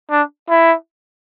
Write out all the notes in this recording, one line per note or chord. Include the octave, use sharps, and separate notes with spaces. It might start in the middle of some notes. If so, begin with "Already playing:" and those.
D4
E4